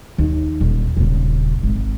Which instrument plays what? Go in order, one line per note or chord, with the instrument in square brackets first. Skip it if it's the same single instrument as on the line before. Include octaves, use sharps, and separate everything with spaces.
[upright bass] D#2
D#1
D#1 C#3
G#1